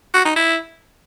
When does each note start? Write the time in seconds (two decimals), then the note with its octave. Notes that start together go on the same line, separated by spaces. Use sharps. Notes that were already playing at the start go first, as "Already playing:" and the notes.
0.14 F#4
0.25 D#4
0.36 E4